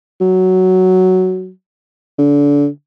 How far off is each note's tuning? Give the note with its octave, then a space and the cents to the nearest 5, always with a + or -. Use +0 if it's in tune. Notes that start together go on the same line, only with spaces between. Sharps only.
F#3 +5
D3 -30